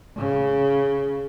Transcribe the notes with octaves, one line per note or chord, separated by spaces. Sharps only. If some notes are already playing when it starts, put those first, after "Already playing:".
C#3